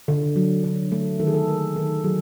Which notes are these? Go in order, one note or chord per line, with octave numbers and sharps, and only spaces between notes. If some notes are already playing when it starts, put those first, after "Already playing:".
D3
F#3
D3
A3
D#3 A4
G#4
A4
A3 A#4
D#3 A4
F#3 G#4